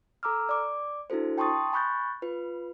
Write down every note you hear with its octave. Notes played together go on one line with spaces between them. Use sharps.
A4 A#5 D6 E6 F6
D5 D6
D4 E4 F#4 A4 C5
G5 A5 C6 C#6 D#6 A6
G#5 B5 C#6 F#6 G6 A6
F4 B4